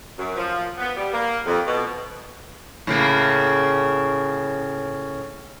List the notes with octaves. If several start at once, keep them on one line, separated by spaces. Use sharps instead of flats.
F#2
F3
B3
G3
A#3
F2
B2
A2 C#3 A#3